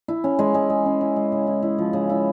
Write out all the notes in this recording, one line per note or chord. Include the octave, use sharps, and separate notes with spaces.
E4
C#4
G#3
G#3
G#3
C#4
E4
G#3
C#3
E4
E4
F3
C#3
E4